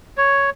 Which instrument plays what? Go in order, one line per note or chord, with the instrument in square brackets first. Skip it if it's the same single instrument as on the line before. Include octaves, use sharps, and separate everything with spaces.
[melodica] C#5